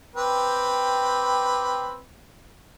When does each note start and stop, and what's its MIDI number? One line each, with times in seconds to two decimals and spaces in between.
0.16 1.99 60
0.16 1.99 67
0.16 1.99 71